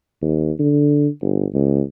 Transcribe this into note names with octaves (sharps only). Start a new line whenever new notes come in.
D#2
D3
G1
C#2